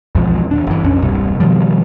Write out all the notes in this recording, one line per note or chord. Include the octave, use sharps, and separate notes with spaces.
B1 E2 G#2 F3
E2 C3 D4
G1 E3
B1 F2 C#4 D4
E1 C2 G2 C3
B2 D#3 F3 G3